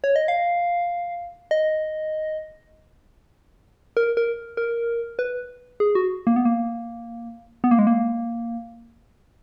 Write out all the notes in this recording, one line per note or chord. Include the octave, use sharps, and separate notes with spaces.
C#5
D#5
F5
D#5
A#4
A#4
A#4
B4
G#4
F#4
A#3
B3
A#3
B3
A#3
G#3
A#3